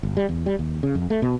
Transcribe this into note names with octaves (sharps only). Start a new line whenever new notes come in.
G1
G3
E2
G3
D#2
C#3
F2
A3
B2